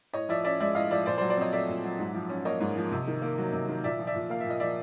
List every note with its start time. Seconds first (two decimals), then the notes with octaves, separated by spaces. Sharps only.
0.13 A2 C#5 D#5
0.29 F3 D5 E5
0.44 C#4 D5 E5
0.60 G#3 D5 E5
0.75 A2 D#5 F5
0.91 F3 D5 E5
1.06 A#2 C5 D5
1.18 C5 D5
1.21 F#3
1.30 C5 D5
1.37 C4 C#5 D#5
1.52 A3 D5 E5
1.69 A#2
1.84 F#3
1.99 G#2
2.14 F3
2.29 C#4
2.45 A#3 C#5 D#5
2.60 G#2
2.76 F3
2.91 C3
3.07 D#3
3.22 A#3
3.38 F#3
3.53 C3
3.69 D#3
3.84 A#2 D5 E5
3.99 F3
4.07 D5 E5
4.15 A#2
4.30 A#3 F5
4.40 E5
4.46 A#2 D#5
4.60 F3 D5 E5